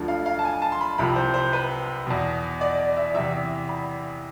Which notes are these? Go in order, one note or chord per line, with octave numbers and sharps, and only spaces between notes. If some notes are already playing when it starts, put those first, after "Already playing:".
Already playing: D2 D3 F3
F5
F5
A5
G#5
A5
C6
B5
C2 C3 F3 B5
C5
C5
B4
E2 B2
D5
D5
E5
E2 C3 E3 E5
B5